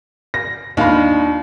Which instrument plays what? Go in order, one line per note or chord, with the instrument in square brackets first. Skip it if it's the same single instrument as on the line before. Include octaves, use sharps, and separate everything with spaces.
[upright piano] A#6
[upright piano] D#2 F5 B5 [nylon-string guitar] D4 D#4 F4